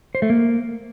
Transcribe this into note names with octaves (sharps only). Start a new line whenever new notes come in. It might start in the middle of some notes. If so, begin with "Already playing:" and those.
C5
A3
A#3